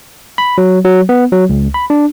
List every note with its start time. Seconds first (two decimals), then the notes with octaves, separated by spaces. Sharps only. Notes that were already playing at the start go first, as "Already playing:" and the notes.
0.38 B5
0.58 F#3
0.85 F#3
1.09 B3
1.32 F#3
1.49 C#2
1.74 B5
1.90 D4